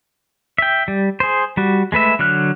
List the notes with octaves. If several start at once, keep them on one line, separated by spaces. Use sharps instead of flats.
E5 G5
G3
G#4 C5
G3 F#4
G#3 A3 B4 E5
D3 F#3 F6 F#6